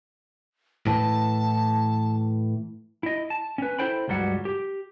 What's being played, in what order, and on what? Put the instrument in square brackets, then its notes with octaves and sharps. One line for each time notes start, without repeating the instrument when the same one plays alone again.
[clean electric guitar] A2 E3 [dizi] A5
[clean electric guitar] E4 D#5
A5
C#4 B4
E4 A4 C5 G5 B5
C#2 G2 F#3 G3 F#5
G4